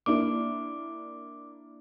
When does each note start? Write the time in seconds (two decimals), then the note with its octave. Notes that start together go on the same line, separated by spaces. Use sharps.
0.06 A#3 D4 E4 D6